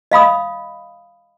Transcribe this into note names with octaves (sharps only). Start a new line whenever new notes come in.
D#5 F5 B5 D#6